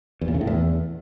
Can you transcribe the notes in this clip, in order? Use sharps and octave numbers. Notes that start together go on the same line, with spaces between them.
E2
A#2
C#3
A2
E2